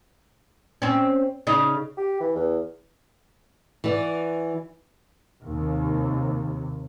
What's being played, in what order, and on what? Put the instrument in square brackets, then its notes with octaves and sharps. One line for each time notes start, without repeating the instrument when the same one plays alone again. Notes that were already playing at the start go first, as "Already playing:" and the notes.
[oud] C4 C#4
C#3 D#4
[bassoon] G4
E3
E2
[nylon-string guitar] E3 F#4 D5
[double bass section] D#2 C3